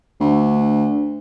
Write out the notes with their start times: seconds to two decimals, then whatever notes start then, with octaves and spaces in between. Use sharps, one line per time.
0.20 D2